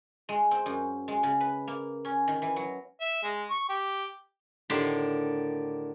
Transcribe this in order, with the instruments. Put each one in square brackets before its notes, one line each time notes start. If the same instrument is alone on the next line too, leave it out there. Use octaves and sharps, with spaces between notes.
[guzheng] G#3
C4
F#2
G#3
C#3
B4
A#3
C#4
D#3
E3
F#3
[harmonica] E5
G#3
C#6
G4
[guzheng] A2 D3 D#3 G4 B5 C6